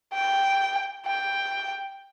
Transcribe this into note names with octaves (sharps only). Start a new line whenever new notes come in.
G5
G5